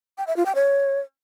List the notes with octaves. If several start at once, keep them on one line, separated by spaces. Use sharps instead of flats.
G5
E5
F4
G5
C#5